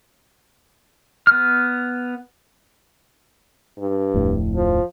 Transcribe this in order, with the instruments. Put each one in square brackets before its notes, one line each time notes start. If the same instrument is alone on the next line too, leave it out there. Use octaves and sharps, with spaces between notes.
[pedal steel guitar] B3 F6
[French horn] G2
[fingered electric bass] D1 F2 A2
[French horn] F3